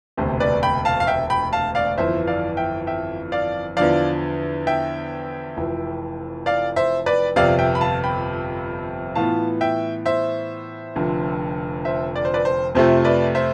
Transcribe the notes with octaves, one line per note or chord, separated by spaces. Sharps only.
E1 D2 C3 C5
B4 D5
G5 B5
F5 A5
F5
E5 G5
G5 B5
F5 A5
D5 F5
G1 F2 E3 C5 E5
D5 F5
E5 G5
E5 G5
D5 F5
E2 D3 F3 D5 F5
E5 G5
F1 F2 E3
D5 F5
C5 E5
B4 D5
G1 F2 C3 D5 F5
E5 G5
B5
F5 A5
G5 B5
A2 E3 B3 F4 F5 A5
E5 G5
C5 E5
F1 F2 D3
C5 E5
D5
C5
B4 D5
C5
F2 C3 F3 A3 C5
B4 D5
C5 E5